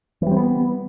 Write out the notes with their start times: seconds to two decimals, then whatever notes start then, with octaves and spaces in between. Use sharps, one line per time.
0.22 E3
0.27 G3
0.31 C4
0.36 B3